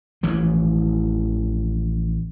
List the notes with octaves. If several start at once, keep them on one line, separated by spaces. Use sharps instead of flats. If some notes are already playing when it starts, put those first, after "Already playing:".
A1 E3 F3